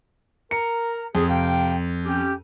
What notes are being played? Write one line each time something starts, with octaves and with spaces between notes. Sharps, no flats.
A#4 A#5 C#7
F2 G#4
C3 F5 G5
C#4 G4